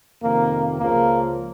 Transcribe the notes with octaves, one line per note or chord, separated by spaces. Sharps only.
F2 C3 D#3 A#3
C#2 C#3 F3 A#3